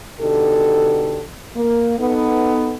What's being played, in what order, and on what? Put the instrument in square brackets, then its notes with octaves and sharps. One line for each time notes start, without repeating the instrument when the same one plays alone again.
[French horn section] B2 D3 D#4 G4 A4
A#3
B3 D#4 A4